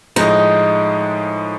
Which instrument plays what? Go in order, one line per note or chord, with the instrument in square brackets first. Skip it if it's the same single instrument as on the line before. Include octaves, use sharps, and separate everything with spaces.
[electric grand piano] A2 F3 G#3 [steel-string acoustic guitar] D#4